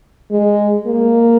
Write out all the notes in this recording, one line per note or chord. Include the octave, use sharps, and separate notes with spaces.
G#3
A#3